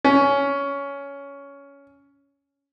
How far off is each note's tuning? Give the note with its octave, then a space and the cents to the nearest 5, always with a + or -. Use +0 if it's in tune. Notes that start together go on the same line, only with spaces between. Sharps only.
C#4 +15